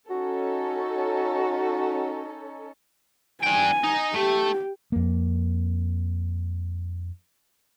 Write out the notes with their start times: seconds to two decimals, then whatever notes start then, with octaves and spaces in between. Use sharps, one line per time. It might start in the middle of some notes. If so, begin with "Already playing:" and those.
0.10 C#4 D#4 F#4 A4
3.43 D4 G5 G#5
3.84 D#4
4.14 A3 G4
4.92 F2 A#3